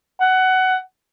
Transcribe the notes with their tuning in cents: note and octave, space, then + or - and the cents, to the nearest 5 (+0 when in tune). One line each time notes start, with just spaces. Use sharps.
F#5 +15